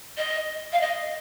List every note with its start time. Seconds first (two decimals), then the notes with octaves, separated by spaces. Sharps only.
0.18 D#5
0.73 F5
0.81 D#5